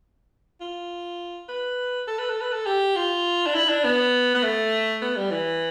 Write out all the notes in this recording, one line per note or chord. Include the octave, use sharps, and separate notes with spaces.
F4
B4
A4
B4
A4
B4
A4
G4
F4
D4
E4
D4
B3
B3
A3
B3
G3
E3